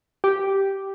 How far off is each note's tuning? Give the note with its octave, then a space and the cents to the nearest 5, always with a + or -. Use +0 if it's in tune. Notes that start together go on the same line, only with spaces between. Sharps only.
G4 -5